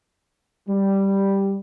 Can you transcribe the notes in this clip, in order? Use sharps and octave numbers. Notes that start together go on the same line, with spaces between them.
G3